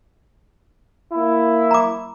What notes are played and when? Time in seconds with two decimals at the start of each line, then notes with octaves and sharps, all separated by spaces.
1.13 A#3 E4
1.71 A#5 D6